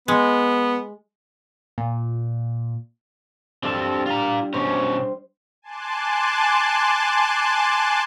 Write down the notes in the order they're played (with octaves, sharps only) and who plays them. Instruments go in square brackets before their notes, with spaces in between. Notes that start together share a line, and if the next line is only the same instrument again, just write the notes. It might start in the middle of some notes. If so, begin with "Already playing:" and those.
[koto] G#3 [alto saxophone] B3
[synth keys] A#2
[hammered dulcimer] G2 [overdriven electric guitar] C4 A4
[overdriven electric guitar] F4 A#5
[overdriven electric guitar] B2 C#4 [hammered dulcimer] C5
[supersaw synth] G#5 A5 C6 D6 F#6